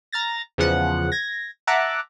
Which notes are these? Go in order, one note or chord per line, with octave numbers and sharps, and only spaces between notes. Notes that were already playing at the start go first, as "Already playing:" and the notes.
A#5 F6 A6 A#6
E2 C#3 F3 F#5 F#6
G#6 A#6
E5 F#5 A5 A#5 D6 F#6